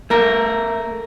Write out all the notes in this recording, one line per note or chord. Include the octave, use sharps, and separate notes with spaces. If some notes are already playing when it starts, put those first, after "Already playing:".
A3 A#4